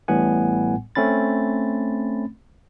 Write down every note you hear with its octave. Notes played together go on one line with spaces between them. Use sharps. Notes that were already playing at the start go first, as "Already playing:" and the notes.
A1 A2 G3 B3 F#5 G#5
A3 C4 C#4 B5 A6